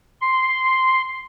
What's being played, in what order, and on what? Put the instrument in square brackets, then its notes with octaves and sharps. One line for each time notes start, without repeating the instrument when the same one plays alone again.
[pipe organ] C6